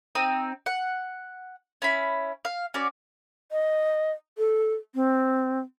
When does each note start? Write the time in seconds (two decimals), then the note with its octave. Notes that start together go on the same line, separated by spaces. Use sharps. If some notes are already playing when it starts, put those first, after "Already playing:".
0.15 C4 D#4 D#6
0.66 F#5
1.82 C#4 E4 B5
2.45 F5
2.74 C#4 F#4 D5
3.52 D#5
4.38 A4
4.95 C4